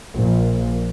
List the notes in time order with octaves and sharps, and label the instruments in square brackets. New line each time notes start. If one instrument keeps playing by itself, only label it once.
[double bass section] A#1